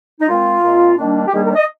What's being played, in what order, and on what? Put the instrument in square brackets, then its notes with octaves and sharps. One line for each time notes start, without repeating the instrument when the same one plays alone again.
[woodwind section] D#4
A#2 G#3 C4 F4
A#2 G#3 C4
D#3 G3 A#3 D4
G4
D#3 G3 A#3 D4 G#4
A#4
D5
D#5